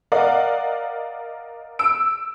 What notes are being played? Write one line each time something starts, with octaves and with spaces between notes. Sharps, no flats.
A#4 D5 D#5 F5 F#5
E6 D7